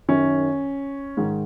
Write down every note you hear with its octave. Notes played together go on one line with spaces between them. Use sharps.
F#2 D#3 C#4
G#2 D#3